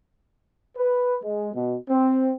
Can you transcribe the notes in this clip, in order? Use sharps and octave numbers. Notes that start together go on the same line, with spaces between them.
B4
G#3
B2
C4